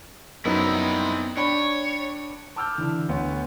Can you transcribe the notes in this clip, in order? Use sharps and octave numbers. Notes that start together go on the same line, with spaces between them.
F#2 B3 C4 D#4 E4
D4 C#5 G5 B5
A5 D6 E6 F6 G6
D3 E3
D2 B3 C#5